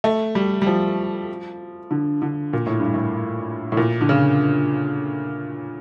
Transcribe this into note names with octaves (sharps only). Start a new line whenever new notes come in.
A3
G3
G3
F3
D3
D3
A#2
A2
G2
A2
A2
A#2
D3
C#3